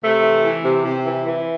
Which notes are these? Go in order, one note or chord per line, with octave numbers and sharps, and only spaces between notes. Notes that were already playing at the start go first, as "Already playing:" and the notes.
C3 A3
E3
E3
C3
C3
E3
E3